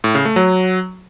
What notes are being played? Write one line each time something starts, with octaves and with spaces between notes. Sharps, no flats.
A2
C#3
A3
F#3